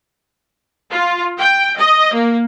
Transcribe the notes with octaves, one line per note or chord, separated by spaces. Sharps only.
F4
G5
D#5
A#3